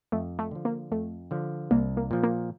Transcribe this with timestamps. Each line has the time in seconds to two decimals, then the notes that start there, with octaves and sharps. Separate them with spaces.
0.12 F2 A3
0.39 A3
0.51 D3 F3
0.65 A#3
0.92 F2 A3
1.31 D3 F3
1.71 C2 A#3
1.97 A#3
2.11 A#2 F3
2.23 A#3